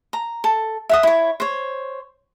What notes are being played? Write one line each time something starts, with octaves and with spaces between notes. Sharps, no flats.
A#5
A4
E5 F#5 D#6
E4 C#5
C5 C#5